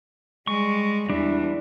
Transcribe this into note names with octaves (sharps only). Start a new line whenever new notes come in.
G3 G#3 C#6
E2 E3 G3 D4